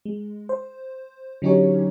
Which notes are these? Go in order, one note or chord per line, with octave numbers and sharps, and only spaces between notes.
G#3
C5
D3 F#3 C#4 D#4 G4 C#5